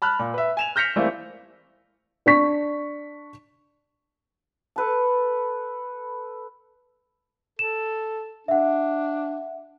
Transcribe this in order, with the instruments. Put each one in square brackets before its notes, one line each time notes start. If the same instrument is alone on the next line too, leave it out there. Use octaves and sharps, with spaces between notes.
[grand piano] A5 B5 F6 F#6
A#2
B4 E5
G#5 E7 F7
F6 G6 A#6 B6 C#7 F7
E3 G3 A3 A#3 C4 E4
[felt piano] D4 C#6 B6
[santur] A4 B4 A5
[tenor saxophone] A4 [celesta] E7
[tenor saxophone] D4 [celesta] E5 F#5